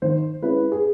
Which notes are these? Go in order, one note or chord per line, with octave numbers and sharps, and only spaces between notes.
D#3 C5
G#3 C#4 E4 B4
G#4